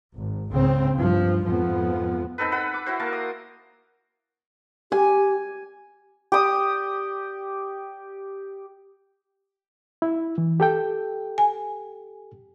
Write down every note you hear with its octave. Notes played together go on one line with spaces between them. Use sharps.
G#1
C#2 G#2 C#3 C4
G2 F3
F2 G#2 F3 B3
C4 D#4 A4 B4
B4 F#5 B5
D6
E4 F#4 C5
A#3 A#4 A5
D#6
G4 G#5
G4 D#6
E4
E3
G4 A4 G5
G#5